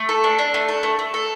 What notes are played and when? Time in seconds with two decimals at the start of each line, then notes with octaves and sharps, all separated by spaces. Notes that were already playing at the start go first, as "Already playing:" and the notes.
Already playing: A3 A5
0.09 A4
0.24 D4
0.38 D4
0.54 A3
0.68 A4
0.83 A3
0.99 A3
1.14 A4